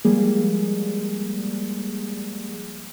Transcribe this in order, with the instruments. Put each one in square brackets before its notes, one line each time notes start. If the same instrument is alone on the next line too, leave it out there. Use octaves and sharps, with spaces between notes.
[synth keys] F3 G3 G#3 A#3 G#4